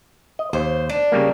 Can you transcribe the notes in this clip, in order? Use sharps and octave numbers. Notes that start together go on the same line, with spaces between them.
D#5
D#2 C5
D4
C#3 G3 A#3